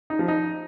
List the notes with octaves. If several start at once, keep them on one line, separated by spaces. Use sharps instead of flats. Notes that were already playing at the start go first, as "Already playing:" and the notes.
D#4
F3
D#4